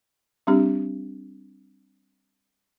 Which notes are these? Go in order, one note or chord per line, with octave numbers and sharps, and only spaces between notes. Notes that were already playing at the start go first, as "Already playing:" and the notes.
G3 C4 D4 G4